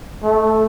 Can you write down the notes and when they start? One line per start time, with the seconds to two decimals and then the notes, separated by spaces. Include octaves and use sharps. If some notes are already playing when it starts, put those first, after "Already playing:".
0.23 A3